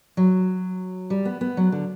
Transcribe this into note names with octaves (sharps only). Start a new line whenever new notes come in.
F#3
G3
B3
B3
F#3
D3